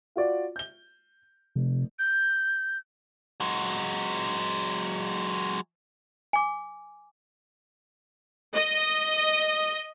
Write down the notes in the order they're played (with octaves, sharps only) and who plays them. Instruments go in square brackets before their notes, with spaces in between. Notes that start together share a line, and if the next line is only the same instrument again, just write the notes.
[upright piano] F4 F#4 D5
G6 G7
[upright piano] F1 [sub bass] C3
[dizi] G6
[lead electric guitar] F#3 G#3
[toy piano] G#5 D6
[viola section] D#5